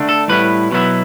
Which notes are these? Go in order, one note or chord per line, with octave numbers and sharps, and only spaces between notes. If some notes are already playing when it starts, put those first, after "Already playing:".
Already playing: D3 A3 D4
A4
A2 G3 B3 E4 B4
B2 F#3 B3 E4